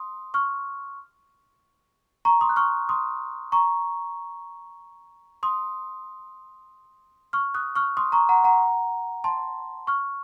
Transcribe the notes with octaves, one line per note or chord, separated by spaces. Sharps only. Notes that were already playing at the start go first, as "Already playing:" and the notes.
Already playing: C6 D#6
C#6 F6
A#5 C#6
C6 D#6
F#6
C#6 F6
C6 D#6
A#5 C#6
C6 D#6
C#6 F6
D#6 F#6
C#6 F6
C6 D#6
A#5 C#6
F#5 A#5
F#5 A#5
A5 C6
C#6 F6